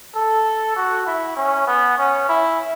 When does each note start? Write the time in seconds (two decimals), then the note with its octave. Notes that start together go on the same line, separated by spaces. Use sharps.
0.15 A4
0.76 F#4
1.06 E4
1.36 C#4
1.67 B3
1.97 C#4
2.29 E4